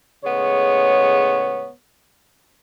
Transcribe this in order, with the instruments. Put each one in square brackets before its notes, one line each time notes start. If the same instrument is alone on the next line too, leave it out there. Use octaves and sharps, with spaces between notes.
[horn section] A2 C#3 G#3 B3 C#5